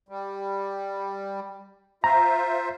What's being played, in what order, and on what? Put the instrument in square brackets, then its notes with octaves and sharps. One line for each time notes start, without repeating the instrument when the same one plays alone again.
[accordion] G3
[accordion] F4 C5 E5 [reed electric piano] A#5